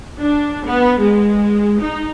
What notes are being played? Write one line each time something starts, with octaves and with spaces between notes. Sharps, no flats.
D4
B3
G#3
D#4